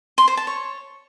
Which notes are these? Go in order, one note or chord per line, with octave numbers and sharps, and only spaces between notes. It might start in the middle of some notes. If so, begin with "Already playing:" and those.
C6
C5
A5
C#5